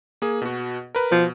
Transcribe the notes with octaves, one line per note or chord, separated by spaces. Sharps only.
A#3 G#4
B2 F#4
A#4 B4
B2 F3